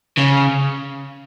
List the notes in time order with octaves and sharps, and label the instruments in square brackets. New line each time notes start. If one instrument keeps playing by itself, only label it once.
[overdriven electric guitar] C#3